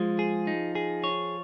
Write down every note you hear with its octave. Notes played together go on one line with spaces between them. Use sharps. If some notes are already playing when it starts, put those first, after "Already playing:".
Already playing: F3 G#3
G#4
D#4
G#4
C#5